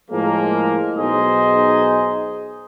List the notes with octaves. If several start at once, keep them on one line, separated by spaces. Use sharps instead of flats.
A2 F3 G#3 A#3
B1 D#4 G#4 C5 D#5 G#5